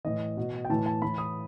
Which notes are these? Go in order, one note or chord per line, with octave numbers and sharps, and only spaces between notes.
A2 E3 D#5
B2
G5
A2 E3 A5
A5
A2 E3 B5
D#6